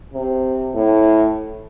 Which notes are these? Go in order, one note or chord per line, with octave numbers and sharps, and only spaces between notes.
C3
A2